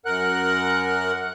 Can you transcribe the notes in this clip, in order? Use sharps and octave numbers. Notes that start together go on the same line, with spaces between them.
F#2 A#4 F#5 F#6